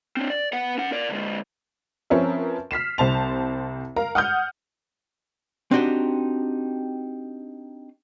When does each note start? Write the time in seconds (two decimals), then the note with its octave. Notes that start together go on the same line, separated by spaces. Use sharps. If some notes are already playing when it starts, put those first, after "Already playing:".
0.17 C4 D4
0.30 D5
0.53 B3 F#5
0.78 C#4 F#5
0.92 A#4 D5
1.09 D3 G#3
2.10 F3 C4 C#4 A#4 B4 E5
2.71 F6 B6 C7 E7
2.98 C2 C5 A5 F7
3.96 A#4 F5 A#5
4.15 F#5 D#6 F6 G6
5.71 C4 D4 D#4 F#4 G4 C5